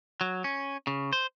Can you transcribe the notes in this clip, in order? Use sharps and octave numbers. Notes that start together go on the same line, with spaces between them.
F#3
C#4
C#3
C5